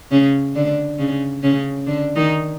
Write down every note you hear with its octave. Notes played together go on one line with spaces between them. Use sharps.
C#3 C#4
D3 D4
C#3 C#4
C#3 C#4
D3 D4
D#3 D#4